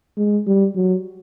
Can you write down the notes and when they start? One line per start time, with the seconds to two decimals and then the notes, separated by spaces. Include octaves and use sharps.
0.17 G#3
0.47 G3
0.76 F#3